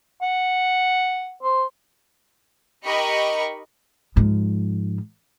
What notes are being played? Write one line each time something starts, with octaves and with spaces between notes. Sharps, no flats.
F#5
C5
D#4 G4 A#4 D#5 B5 C#6
G#2 F3